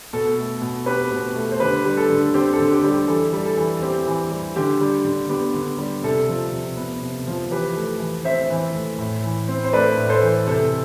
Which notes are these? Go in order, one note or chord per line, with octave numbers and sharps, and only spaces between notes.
B2 A4
A3
B2
C4 G4 B4
B2
A3
C5
D3 G4 B4
G3
A4
D3
C4 G4
A4
D3
G4
G3
G4
E3 A4
G3
A4
E3
C4 G4
E3
G3
D3 G4
G3
D3
B3 G4
D3
G3
C3 A4
F3
C3
B3
C3
F3
E3 G4 B4
A3
E3
C4 C5 E5
E3
A3
A2
E3
C4
C5
A3 B4 D5
A2
A4 C5
E3
C3 A4